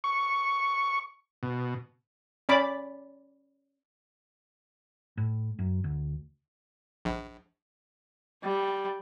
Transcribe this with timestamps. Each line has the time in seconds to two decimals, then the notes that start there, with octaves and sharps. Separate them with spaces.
0.04 C#6
1.43 B2
2.49 C#4 D5 B5 D6
5.17 A2
5.59 F#2
5.84 D2
7.05 A#1
8.43 G3